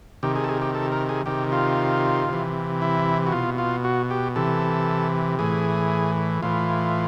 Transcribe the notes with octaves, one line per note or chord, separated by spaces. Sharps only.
C3 D#3 G4
G#4
A4
G#4
G4
A4
A#4
G#4
C3 D#3 G4
F4
C3 E3
E4
F#4
B2 F4
F4
F#4
G4
C3 E3 A4
A2 E3 G#4
A2 E3 F4